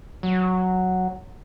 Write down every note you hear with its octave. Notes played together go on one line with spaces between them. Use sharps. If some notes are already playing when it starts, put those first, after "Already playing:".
F#3